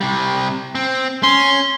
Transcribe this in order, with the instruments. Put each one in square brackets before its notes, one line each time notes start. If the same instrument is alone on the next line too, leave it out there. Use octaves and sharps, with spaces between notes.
[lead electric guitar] C3 G3
C4
[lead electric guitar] C#4 [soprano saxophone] C6